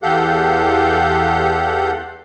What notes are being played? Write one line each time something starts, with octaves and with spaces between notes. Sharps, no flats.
E2 G4 A4 F5 F#5 G6